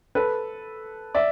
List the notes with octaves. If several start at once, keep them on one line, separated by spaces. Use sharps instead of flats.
A4 B4
D5 E5